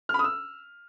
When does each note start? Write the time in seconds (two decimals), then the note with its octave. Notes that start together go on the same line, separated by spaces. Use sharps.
0.09 F6
0.14 B5
0.19 D#6
0.24 E6